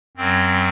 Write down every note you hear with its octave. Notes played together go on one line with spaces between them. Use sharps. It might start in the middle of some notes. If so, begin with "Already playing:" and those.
F#2 F#3 C4